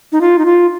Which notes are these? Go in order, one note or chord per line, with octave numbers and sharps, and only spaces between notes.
D#4
F4
D#4
F4